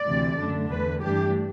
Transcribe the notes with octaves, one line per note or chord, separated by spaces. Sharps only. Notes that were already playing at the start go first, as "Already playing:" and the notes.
Already playing: D5
D2 C3 E3 A3
F#2 D3 A3 D4
E2 D3 A3 B4
G2 E3 A3 D4 G4